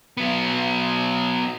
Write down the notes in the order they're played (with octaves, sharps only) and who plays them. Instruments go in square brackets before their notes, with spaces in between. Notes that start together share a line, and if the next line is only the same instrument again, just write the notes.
[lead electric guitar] F#3 B3